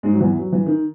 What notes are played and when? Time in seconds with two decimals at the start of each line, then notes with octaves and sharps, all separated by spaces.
0.03 G#2 G#3
0.13 F#3
0.21 E2 E3
0.39 F#3
0.52 E3
0.66 D#3